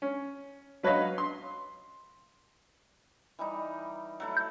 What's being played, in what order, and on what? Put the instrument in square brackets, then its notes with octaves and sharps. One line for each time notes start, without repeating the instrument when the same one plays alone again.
[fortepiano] C#4
F#3 B4 C#5 D#5 F5
C6
[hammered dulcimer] E3 G3 D#4
F#3 A3 E4
[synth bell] G6